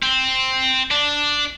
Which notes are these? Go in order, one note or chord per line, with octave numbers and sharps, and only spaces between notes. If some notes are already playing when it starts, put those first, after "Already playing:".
C4
D4